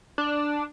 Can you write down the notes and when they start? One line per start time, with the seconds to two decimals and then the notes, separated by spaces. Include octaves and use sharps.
0.18 D4